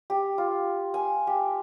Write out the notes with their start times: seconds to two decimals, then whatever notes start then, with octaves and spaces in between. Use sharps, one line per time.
0.10 G4
0.38 F4
0.94 G#5
1.27 G4